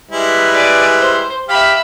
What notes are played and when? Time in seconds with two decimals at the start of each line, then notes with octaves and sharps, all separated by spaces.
0.11 G3 G#3 E4 B4
0.54 G#4 D5
1.00 C5
1.49 G4 E5 F5 B5